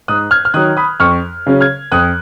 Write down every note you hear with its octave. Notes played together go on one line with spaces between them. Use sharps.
G#2 D#6 F#6
F6 G#6
F6
D#3 F#3 D#6 F#6
B5 D#6
F2 C#6 F6
C#3 F#3 C#4
F6 G#6
F2 D#6 F#6